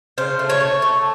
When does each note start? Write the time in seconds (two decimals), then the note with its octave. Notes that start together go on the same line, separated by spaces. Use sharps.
0.18 C#3 C5
0.39 A3
0.50 C#5
0.60 A3
0.82 A3